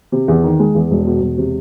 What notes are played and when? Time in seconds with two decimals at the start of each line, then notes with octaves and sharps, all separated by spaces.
0.12 C3
0.28 E2
0.44 D#3
0.59 G#3
0.75 E2
0.91 E1
1.06 B2
1.22 E1
1.38 C3